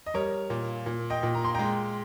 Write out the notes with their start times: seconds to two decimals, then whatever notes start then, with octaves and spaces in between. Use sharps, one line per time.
0.06 D#5
0.14 G3 A#4 C#5
0.50 A#2
0.86 A#2
1.10 D#5 G5
1.23 A#2
1.35 A#5
1.45 C6
1.54 G#3 G5 A#5